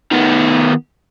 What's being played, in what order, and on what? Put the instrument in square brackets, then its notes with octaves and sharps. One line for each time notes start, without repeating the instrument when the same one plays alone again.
[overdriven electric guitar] D#3 B3